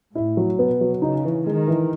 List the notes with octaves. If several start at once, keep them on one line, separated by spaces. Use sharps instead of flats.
A2 E4
F#3
B2 B3
F#3
C#3 D#4
E3
D#3 G#3
E3